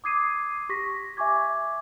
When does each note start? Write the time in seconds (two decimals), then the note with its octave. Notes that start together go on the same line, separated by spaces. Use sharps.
0.04 D6 D#6 G#6 C7 D#7
0.69 G4 C#6 A#6 B6
1.17 E5 G#5 C#6 D6 G#6